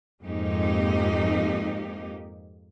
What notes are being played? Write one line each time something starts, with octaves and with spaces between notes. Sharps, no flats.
F2 G#2 G#3 A#3 D#4 G4